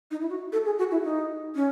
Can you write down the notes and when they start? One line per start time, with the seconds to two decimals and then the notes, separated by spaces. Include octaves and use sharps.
0.11 D#4
0.21 E4
0.30 F#4
0.52 A4
0.65 G#4
0.78 F#4
0.91 E4
1.04 D#4
1.55 C#4